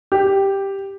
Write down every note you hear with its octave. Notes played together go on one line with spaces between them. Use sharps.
G4